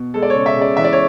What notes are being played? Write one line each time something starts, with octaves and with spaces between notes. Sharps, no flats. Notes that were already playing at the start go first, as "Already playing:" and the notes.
Already playing: B2
G#3 A4
D5
C#5
C#3
E5
C#3 D5
E3 E5
D5
C#5